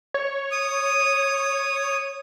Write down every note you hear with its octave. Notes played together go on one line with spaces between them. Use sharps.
C#5
D#6